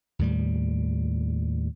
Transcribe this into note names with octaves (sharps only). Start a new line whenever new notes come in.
D#2 A2 G3